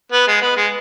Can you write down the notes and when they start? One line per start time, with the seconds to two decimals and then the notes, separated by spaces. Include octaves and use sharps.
0.12 B3
0.28 G#3
0.41 B3
0.57 G#3